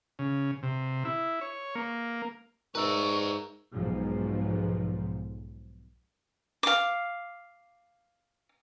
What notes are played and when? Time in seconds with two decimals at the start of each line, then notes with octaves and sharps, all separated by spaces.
0.19 C#3
0.63 C3
1.05 E4
1.41 C#5
1.75 A#3
2.75 G#2 A#4 B4 D5 E5 C#6
3.73 B1 G#2 B2 F3
6.63 F5 D6